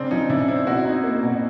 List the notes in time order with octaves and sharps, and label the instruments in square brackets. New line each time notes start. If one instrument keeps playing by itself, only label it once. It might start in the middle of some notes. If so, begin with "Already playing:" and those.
Already playing: [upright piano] C#3 [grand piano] C4 D4
[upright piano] F3 [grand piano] C#4 D#4
[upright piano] C#3 [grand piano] D4 E4
[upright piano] C4 [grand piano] D4 E4
[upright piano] B2 [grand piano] E4 F#4
[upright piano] D#4
A#3
B2